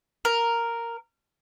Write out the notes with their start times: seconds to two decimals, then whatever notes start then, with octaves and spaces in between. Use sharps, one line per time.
0.25 A#4